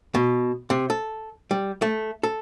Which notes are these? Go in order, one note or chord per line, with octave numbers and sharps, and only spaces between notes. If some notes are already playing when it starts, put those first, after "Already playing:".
B2
C3
A4
G3
A3
A4